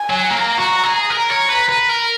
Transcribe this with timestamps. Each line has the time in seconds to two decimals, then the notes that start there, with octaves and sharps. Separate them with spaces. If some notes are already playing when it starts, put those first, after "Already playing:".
Already playing: G#5
0.10 F#3
0.30 A#3 A#5
0.57 F#4
0.84 G#4
1.09 A#4 A#5
1.29 C#5
1.49 B4
1.69 B4
1.89 A#4